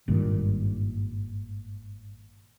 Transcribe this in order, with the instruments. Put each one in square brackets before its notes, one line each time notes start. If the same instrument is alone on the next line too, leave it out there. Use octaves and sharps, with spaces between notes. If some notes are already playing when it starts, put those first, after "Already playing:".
[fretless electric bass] G#1 G2 A#2 D#3